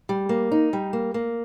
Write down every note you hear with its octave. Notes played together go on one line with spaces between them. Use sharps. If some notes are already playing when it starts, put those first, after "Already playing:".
G3
A#3
D#4
G3
A#3
A#3